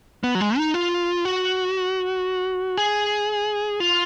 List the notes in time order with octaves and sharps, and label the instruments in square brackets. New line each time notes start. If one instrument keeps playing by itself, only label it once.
[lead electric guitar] B3
F#3
G#3
D#4
F4
F#4
G#4
F4